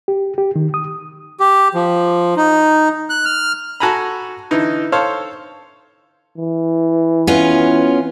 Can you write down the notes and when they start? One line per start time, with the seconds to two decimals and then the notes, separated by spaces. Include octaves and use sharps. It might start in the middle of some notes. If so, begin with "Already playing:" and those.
0.08 G4
0.38 G4
0.56 D#3
0.74 D#6
1.40 G4
1.75 F3
2.37 D#4
3.10 F#6
3.25 F6
3.80 F#4 A4 G#5 A#5 B5
4.51 D3 E3 D#4 E4
4.92 A4 C5 C#5 F5
6.38 E3
7.27 B3 C#4 F4